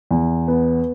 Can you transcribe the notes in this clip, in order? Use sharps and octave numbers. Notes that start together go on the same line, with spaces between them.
E2
B3